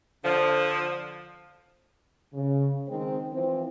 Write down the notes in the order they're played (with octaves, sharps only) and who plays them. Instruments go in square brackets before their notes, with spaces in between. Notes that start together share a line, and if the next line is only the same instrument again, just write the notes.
[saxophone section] D3 F3
[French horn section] C#3
D#3 G#3 C4
E3 F3 C4